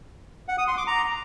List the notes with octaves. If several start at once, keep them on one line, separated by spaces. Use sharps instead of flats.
F#5
D#6
C6
D6
A#5